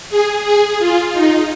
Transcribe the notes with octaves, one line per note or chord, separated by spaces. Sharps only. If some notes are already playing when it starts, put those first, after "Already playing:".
G#4
G#4
F4
D#4